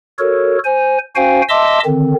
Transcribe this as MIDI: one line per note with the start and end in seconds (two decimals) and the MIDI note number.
0.19 0.58 66
0.19 0.58 69
0.19 0.58 70
0.19 0.58 73
0.64 0.98 72
0.64 0.98 80
1.16 1.42 61
1.16 1.42 66
1.16 1.42 72
1.16 1.42 77
1.16 1.42 79
1.16 1.42 80
1.49 1.80 75
1.49 1.80 76
1.49 1.80 81
1.49 1.80 84
1.49 1.80 86
1.49 1.80 88
1.85 2.14 50
1.85 2.14 51
1.85 2.14 60